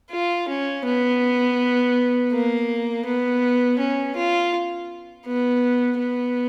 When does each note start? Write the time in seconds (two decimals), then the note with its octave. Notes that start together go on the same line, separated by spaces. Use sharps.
0.11 F4
0.48 C#4
0.85 B3
2.32 A#3
3.06 B3
3.79 C#4
4.16 F4
5.26 B3
5.99 B3